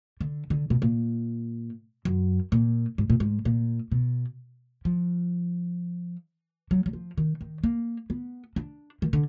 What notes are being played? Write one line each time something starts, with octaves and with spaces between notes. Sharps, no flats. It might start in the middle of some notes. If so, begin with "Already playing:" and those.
D3
D3
B2
A#2
F#2
A#2
G#2
A#2
G#2
A#2
B2
F3
F#3
F#3
F3
D#3
D#3
A#3
B3
D4
D#3
D3